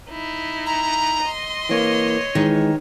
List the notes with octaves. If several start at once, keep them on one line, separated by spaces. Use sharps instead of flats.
D#4 E4
A#5
D#5 C6
E3 A#3 C#5
D#3 E3 G#3